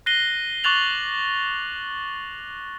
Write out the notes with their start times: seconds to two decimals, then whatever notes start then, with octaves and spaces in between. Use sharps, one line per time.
0.06 F#6 A#6 C7 D#7 G7
0.64 C#6 D6 F#6 A6 F7 F#7